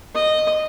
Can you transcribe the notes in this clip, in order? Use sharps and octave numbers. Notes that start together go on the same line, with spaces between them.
D#5